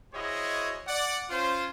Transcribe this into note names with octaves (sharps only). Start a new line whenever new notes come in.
E4 F#4 G#4 C5 C#5 D#5
D5 F#5
C#4 F4 C5